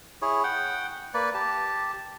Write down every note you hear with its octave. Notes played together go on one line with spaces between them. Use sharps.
E4 G#4 C#5
F#5 G5
A#3 B4 D5
G4 A5